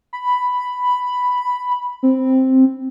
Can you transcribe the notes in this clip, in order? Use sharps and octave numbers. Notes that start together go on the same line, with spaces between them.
B5
C4